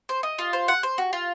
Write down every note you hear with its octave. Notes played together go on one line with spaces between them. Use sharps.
C5
D#5
F4
C5
F#5
C5
F#4
F4